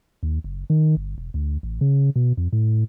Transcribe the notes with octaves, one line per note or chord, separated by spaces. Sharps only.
D#2
F#1
D#3
G1
E1
D2
A1
C#3
B2
F2
A2